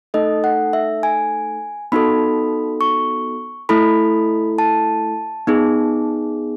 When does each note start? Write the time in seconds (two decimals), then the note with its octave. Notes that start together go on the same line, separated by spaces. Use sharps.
0.14 A3 D#4 A4 D#5
0.44 F#5
0.73 E5
1.03 G#5
1.92 B3 D#4 F#4 A4 B5
2.81 C#6
3.69 A3 E4 A4 B5
4.58 A5
5.47 B3 D#4 G#4